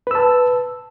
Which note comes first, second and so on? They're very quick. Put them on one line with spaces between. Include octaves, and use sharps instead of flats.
B4 E6 A5